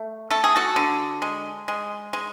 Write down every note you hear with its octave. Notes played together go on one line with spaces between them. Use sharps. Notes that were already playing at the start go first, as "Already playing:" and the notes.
Already playing: A3
A3 A4
G#4
F#4 A4
D3
G#3
G#3
G#3